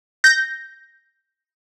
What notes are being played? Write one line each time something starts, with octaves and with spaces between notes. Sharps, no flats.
G6 A#6